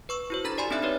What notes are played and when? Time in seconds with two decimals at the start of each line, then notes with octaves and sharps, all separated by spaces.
0.09 B4 C#6 E6
0.30 E4 F#4 C5
0.44 D4 A4 A#5 B5 A6
0.58 G4 D5 G#5 B5 C6
0.71 C4 D4 D#4 D5 E5 F#6
0.82 D#4 G4 B4 C#5